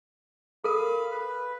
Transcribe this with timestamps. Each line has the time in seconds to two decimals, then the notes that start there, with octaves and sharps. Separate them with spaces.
0.64 A4 A#4 F5 B5
1.11 B4